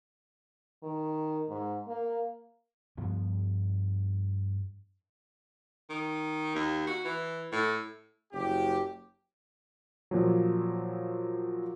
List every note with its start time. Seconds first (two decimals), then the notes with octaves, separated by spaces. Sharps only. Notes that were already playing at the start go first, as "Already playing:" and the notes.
0.83 D#3
1.49 G#2
1.88 A#3
2.97 G2 F3 B3
5.90 D#3
6.55 D#2
6.87 F#4
7.05 E3
7.52 A2
8.33 F#1 G4
10.11 A#2 F3 F#3